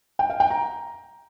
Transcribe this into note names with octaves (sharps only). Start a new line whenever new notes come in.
G5
F5
G5
A#5